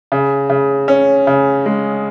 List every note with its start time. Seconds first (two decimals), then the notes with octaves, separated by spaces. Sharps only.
0.12 C#3
0.50 C#3
0.88 C#4
1.27 C#3
1.66 G#3